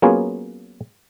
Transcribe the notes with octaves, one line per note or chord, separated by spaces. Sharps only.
F#3 A#3 B3 C#4 F4 G#4